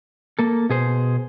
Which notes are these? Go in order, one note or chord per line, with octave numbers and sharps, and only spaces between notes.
A#3 A4
B2 G#4 C5